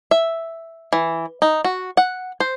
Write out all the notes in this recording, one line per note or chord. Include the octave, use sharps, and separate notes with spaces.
E5
E3
D#4
F#4
F#5
C5